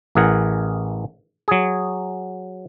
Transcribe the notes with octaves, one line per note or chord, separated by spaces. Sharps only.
A1 E3 G#4 A#4 F#5
F#3 G#4